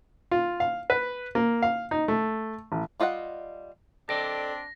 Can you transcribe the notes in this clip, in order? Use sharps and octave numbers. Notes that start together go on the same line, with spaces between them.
F4
F5
B4
A#3
F5
D#4
A3
A1
G3 F4 D#5 F5 F#5
C4 D4 A4 D5 D#5 A#6